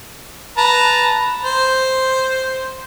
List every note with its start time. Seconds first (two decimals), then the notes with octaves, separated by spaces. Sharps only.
0.58 B4 A5 A#5
1.45 C5